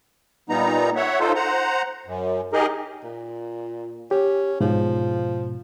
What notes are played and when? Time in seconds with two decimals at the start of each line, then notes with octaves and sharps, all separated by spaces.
0.49 A#2 G3 B3 D#4 A#5
0.96 C#5 E5 F#5
1.20 D#4 F4 A4 C5
1.35 C5 F#5 A#5
2.06 F#2
2.53 D#4 G4 G#4 A#4 D#5
3.04 A#2
4.11 C#4 G4
4.61 G#2 B2 F3